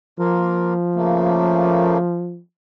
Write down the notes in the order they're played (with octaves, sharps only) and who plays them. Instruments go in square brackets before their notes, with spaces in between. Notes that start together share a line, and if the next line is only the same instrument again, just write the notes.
[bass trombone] F3 [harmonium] A#3 F4 A#4
[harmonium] C#3 A3 A#3